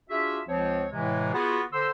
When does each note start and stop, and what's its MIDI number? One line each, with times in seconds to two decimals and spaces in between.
0.10 0.40 62
0.10 0.40 65
0.10 0.40 66
0.10 0.40 68
0.10 0.40 76
0.48 0.86 37
0.48 0.86 53
0.48 0.86 60
0.48 0.86 73
0.92 1.31 45
0.92 1.31 48
0.92 1.31 52
0.92 1.31 56
1.34 1.61 59
1.34 1.61 65
1.34 1.61 66
1.34 1.61 68
1.73 1.89 50
1.73 1.89 72
1.73 1.89 84
1.73 1.89 88